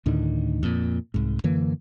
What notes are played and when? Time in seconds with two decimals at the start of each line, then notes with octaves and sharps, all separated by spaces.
0.06 D2 A2 D3 D#3
0.63 F2 A#2
1.14 C2 G#2
1.44 F#2 D3 E3 A#3